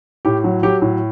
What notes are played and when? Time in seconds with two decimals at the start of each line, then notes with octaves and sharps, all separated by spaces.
0.25 A2 G4
0.44 F#3
0.63 F#3 G4
0.82 A2